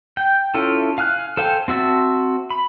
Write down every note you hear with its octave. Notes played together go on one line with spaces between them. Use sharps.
G5
C#4 E4 F4 A4
F5 G#5 F6 F#6
A4 C5 F5 G5 G#5
C4 F#4 E5 A5
B5